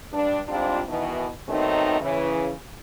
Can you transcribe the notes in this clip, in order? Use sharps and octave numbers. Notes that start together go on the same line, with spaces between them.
G2 D4
G#2 G3 C4 D4 F4
B2 D#3 E3
D#3 F#3 A3 B3 C4 D#4
C#3 E3